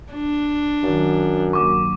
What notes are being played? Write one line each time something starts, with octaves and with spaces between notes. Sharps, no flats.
D4
F#2 D#3 F#3
G2 F#3 A#3 C#6 D6